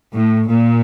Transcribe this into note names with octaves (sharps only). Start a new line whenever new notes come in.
A2
A#2